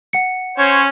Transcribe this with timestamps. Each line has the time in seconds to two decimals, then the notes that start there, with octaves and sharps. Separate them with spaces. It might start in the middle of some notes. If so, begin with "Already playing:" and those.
0.13 F#5 C#7
0.58 C#4 C5 C#5